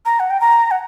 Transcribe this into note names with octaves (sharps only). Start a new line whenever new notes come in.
A#5
F#5
G5
A#5
F#5